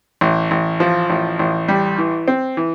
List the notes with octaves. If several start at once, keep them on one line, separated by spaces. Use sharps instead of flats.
A1
A1
F3
A1
A1
G3
E3
C4
E3